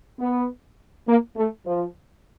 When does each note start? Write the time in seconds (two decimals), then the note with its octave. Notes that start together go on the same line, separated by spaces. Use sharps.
0.19 B3
1.07 A#3
1.36 A3
1.65 F3